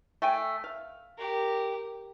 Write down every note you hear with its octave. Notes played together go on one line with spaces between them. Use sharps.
A3 G5 G#5
F5
G4 A#4